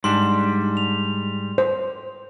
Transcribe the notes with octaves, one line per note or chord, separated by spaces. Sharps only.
G#2 G3 D4 C6
F7
C5